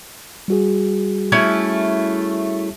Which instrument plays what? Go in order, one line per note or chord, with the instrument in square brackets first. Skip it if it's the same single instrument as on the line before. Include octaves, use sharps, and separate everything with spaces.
[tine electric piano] G3 F#4 G#4
[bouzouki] A3 C#4 E4